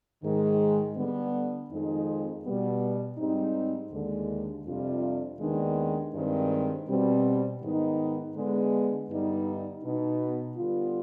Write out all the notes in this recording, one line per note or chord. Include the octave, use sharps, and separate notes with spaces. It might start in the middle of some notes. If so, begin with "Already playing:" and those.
G#2 D#3 G#3
D3 G3 B3
F2 D#3 G#3 C4 D#4
B2 G3 B3
G#2 G3 C4 D#4
D#2 D3 G#3
F2 C3 G3 D4 F4
D#2 D#3 G#3 B3 D4
G2 D#3 G#3 C4
B2 G3 C4
G#2 D#3 B3 D#4
D3 G#3 B3
G2 D3 G3 B3 D#4
B2 B3 D#4
D3 G3 B3 F4